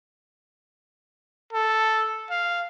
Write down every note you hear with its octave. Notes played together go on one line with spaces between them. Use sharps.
A4
F5